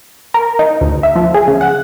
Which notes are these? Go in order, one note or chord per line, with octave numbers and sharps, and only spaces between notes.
A#4
D#4
D2
E5
F3
G#4
C#3
F#5